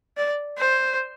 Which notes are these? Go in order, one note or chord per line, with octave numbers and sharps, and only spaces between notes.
D5
C5